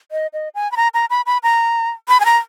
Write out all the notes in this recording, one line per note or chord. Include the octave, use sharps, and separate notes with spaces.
D#5
D#5
G#5
B5
A#5
A#5
B5
B5
A#5
B5
G#5
A#5